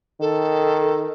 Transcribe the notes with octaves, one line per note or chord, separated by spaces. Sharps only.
D#3 A4